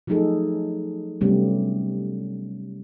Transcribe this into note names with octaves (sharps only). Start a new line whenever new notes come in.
F3 F#3 A3 D#4 G#4 A4
C3 F#3 G3 A3 B3 C#4